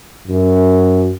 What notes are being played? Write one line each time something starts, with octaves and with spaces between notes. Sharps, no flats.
F#2